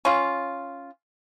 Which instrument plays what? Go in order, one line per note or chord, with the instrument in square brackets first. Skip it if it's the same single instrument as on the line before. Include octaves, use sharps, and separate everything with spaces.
[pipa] C#4 F4